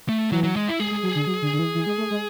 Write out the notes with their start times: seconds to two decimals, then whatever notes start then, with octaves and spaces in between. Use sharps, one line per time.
0.09 A3
0.31 E3 F#3
0.43 F#3
0.56 G#3
0.68 E4
0.80 G#3 G#4
0.91 G#3
1.03 F#3
1.16 D3
1.27 F#3
1.42 D3
1.53 D3
1.59 E3
1.75 E3
1.86 G#3
1.98 A3
2.11 G#3